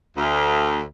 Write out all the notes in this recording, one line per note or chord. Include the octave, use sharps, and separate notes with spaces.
D2